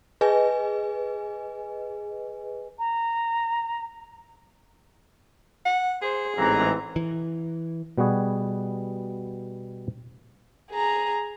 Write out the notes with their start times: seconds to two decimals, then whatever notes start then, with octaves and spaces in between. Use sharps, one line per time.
0.21 G#4 B4 D#5 G#5
2.78 A#5
5.65 F#5
6.02 G#4 C5
6.37 A1 G#2 E3 C4 A#5
6.96 E3
7.98 B2 G3 B3 F#4 G#4
10.71 G#4 A#5